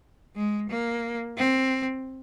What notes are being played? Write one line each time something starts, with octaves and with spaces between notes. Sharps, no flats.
G#3
A#3
C4